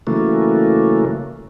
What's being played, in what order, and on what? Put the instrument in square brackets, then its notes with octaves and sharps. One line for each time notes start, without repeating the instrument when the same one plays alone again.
[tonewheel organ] C#3 E3 F#3 A3 A#3